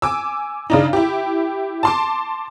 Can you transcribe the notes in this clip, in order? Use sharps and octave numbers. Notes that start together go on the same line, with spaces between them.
G#5 D6 E6
C#3 D4 D#4
E4 G4
A5 C6 D6